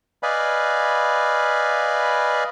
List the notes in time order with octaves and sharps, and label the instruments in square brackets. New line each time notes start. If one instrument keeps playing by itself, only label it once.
[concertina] B4 D5 D#5 F5 G#5 B5